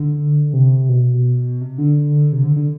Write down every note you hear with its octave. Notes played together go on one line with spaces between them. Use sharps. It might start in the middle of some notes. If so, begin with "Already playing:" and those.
Already playing: D3
C3
B2
C3
D3
C3
D3
D3